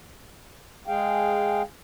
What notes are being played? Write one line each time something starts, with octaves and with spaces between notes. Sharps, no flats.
G#3 G#4 F5 G5